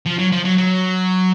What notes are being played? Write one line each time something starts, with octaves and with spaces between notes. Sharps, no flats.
F3
F#3
F3
F#3
F#3